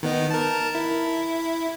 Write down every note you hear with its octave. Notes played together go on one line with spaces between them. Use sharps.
D#3 B3 D#4
A#4 A5
E4